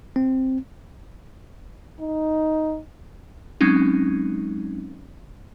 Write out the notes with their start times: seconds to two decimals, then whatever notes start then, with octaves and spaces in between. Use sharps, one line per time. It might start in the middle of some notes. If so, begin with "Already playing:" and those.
0.16 C4
2.01 D#4
3.61 F#3 G#3 C4 C#4 D#4